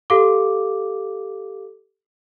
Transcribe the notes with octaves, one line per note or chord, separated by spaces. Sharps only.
G4 A4 F5 D6